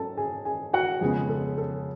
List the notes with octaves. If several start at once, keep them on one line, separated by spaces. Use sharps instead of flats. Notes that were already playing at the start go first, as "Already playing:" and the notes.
Already playing: G#2 F#3 A4 A5
G#4 G#5
G#4 G#5
F#4 F#5
F2 C#3 G#3 B3 G#4
A4
A4